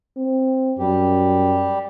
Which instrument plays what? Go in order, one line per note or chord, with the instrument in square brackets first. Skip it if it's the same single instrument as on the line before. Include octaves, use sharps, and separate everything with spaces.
[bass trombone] C4
[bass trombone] F#2 [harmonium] G3 G4